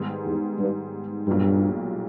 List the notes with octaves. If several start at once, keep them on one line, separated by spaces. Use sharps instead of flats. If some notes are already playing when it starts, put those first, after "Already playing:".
Already playing: G#2 D#3 G3 B3
E2
G2
B1 G2 A#2 G3